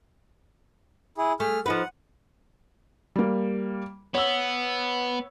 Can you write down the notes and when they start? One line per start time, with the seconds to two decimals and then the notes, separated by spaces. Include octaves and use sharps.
1.18 E4 G#4
1.40 A3 G#4 F6
1.66 F3 D#4 B4 F#5
3.16 G3 A#3
4.15 B3 C#5 E6